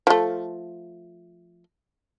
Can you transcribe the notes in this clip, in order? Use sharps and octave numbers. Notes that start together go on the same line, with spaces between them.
F3 A3